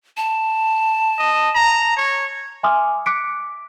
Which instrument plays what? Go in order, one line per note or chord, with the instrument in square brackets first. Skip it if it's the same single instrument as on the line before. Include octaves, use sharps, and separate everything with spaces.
[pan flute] A5
[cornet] D#5
A#5
C#5
[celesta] E5 G#5 C6 D6 D#6 F6
D6 F#6 B6 C#7 D7